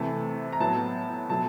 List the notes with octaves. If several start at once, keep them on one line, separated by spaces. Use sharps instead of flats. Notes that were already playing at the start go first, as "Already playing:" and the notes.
Already playing: C3 E3 A3 A5
A#5
A2 F#3 B3 A5
B2 F#3 A3 A5